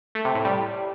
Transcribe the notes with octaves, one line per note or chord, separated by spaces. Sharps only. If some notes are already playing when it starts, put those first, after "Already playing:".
A3
C3
A2
G3